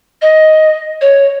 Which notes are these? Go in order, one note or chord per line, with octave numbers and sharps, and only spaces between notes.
D#5
C#5